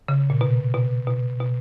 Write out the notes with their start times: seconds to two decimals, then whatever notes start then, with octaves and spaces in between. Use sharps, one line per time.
0.08 C#3
0.30 A#2
0.41 B2
0.74 B2
1.07 B2
1.40 B2